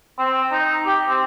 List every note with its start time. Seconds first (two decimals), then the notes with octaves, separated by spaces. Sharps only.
0.18 C4
0.52 D#4
0.85 G4
1.08 C4